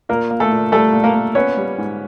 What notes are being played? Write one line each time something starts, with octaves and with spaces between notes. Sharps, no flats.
A#2 A#3 A#4
A#3
A3 A4
A#2
G3 A3 A4
A#2
A#3 A#4
A#3
B3 C#4 C#5
G3
G#2